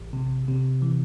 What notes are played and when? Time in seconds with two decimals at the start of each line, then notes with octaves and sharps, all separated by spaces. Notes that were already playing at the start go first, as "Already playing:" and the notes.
Already playing: A1
0.13 C3
0.48 C3
0.82 E3